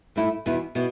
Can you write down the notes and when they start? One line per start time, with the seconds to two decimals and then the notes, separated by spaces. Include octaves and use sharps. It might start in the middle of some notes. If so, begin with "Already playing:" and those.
0.16 A2 A3 E4
0.46 E2 B2 B3 E4
0.75 B2 B3 E4